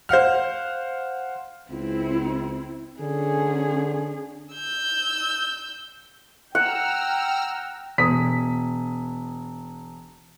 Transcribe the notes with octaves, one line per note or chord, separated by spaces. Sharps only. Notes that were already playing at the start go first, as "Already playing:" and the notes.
C5 F5 F#5 F6
C#2 C4 E4
D3 C#4 G#4
E6 G6
F#5 G5 A#5 E6 F6
E1 D#6 B6